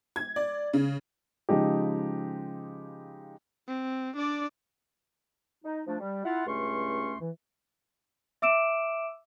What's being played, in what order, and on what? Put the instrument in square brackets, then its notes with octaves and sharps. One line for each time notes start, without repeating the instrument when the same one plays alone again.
[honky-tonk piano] G#6
D5
C#3
[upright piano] C#3 F3 G#3 D#4 G4
[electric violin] C4
D4 D5
[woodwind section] D#4
F3 A3 D4
G3
E4 F4 F#5
C#2 G2 A3 C#4 C6 C#6
E3
[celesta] E5 D6 E6 D7 E7